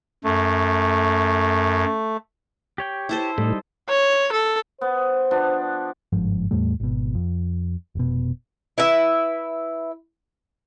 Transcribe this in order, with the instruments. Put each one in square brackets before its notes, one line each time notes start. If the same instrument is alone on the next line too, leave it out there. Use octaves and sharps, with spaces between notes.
[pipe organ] F#2 [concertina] A3
[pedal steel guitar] G4 C#5 G5
[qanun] E4 A4 C5
[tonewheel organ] A2 [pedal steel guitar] G3 D#4
[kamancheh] C#5
A4
[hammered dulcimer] B3 [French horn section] C5
[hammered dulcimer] F3 B3 D4
[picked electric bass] G1 G#2 F3
E2 A2 G3 A3
G#1 B2
F2
F1 B2
[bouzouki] E4 B4 E5